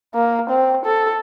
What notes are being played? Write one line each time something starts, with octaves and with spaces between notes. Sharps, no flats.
A#3
C4
A4